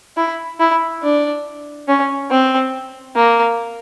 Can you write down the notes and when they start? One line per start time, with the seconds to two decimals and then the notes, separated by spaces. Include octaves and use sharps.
0.17 E4
0.60 E4
1.03 D4
1.88 C#4
2.31 C4
3.16 A#3